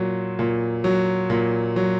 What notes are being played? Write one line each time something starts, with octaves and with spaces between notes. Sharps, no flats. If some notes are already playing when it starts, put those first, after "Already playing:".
Already playing: A#2 F#3
A#2
F#3
A#2
F#3